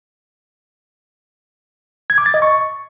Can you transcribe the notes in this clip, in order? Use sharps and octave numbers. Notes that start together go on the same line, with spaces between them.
G#6
D6
A6
D#5
C#6